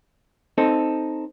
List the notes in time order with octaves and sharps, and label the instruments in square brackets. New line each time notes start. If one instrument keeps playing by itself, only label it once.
[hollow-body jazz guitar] C4 D#4 A4